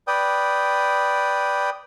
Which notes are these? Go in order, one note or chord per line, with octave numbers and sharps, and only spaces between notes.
B4 D5 G5 D#6